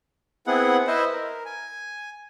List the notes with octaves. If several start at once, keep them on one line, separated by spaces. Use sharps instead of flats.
B3 C4 E4 G#4 F#5
E4 B4 C5 D#5 E5
A#4
G#5